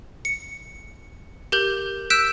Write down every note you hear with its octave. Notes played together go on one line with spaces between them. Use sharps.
C#7
G4 A#4 G6 F#7
E6 F#6 G6 B6 D7 E7